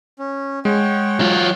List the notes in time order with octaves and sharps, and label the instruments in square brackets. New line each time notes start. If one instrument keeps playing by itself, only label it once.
[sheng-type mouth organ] C#4
[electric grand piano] G#3 [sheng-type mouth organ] C#5 F#5 G5
[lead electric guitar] F#3 F4